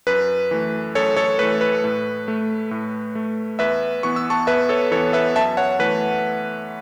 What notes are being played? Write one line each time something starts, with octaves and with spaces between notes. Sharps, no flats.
F#2 B4
E3 A3
F#2 A4 C#5
A4 C#5
E3 A3 B4
B4
A2
A3
A2
A3
E2 B4 E5
E3 B3 C#6
E6
A5 C#6
E2 B4 E5
A4 C#5
E3 B3 A4 C#5
B4 E5
F#2 E5 A5
C#5 F#5
E3 A3 B4